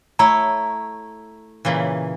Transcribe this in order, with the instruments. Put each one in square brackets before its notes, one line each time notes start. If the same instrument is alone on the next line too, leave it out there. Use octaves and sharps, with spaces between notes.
[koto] A3 E4 C#5 [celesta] A#5
[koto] A#2 C#3 E3